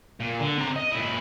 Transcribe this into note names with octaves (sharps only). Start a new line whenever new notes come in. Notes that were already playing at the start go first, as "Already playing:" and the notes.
A#2
D3
C4 A#5
D#5
A#2 E4